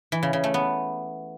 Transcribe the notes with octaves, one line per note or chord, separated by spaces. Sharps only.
E3
C#3
C#3
A3
B3